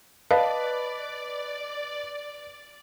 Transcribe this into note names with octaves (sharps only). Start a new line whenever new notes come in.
B4 D5 D#5 F5 A5